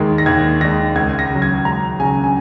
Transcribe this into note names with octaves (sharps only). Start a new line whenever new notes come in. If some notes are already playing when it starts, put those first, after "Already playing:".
Already playing: D#2 D#3 G#3
A#6
D#2 G#6
D#3 G#3 A#6
C#2 G#6
A#6
C#3 F#3
G#6
C#2 A#5
C#3 F#3 G#5
G#5